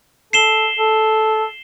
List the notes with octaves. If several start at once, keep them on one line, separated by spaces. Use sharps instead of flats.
A4 C7 E7 G7
A4